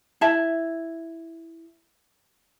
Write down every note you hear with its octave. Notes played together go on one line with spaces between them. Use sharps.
E4 E5 A5